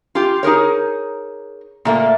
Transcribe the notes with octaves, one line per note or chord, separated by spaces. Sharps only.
F4 G4
D#4 G#4 A#4 C#5
A#2 A3 A#3